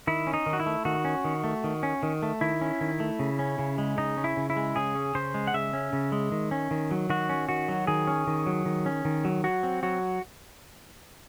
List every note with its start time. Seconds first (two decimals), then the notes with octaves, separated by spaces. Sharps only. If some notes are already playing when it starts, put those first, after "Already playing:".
0.07 D#3 E4
0.27 C#4
0.34 D#4
0.46 D#3
0.53 F#4
0.60 E4
0.66 A3
0.85 D#3 F#4
1.05 C#4
1.24 D#3
1.44 A3
1.64 D#3
1.83 C#4
2.03 D#3
2.23 A3
2.41 D#3 E4
2.61 C#4
2.81 D#3
3.00 A3
3.19 C#3
3.39 C#4
3.59 C#3
3.78 G#3
3.98 C#3 D#4
4.17 C#4
4.24 E4
4.37 C#3
4.50 E4
4.56 G#3
4.76 C#3 G#4
4.95 C#4
5.15 C#3 C5
5.34 G#3
5.47 F#5
5.54 C#3 E5
5.73 C#4
5.93 C#3
6.12 G#3
6.32 D#3
6.51 C#4
6.71 D#3
6.91 F#3
7.10 D#3 F#4
7.29 C#4
7.49 D#3 F#4
7.69 F#3
7.87 D#3 G#4
8.07 C#4
8.27 D#3
8.46 F#3
8.66 D#3
8.86 C#4
9.05 D#3
9.25 F#3
9.44 F#3 F#4
9.63 C4
9.83 F#3 F#4